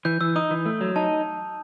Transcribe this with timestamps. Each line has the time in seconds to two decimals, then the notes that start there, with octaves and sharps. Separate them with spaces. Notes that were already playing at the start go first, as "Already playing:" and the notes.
0.05 E3 G6
0.21 E3 E6
0.36 D#4 D#6
0.51 E3
0.66 A3
0.81 F#3
0.96 D#4 A5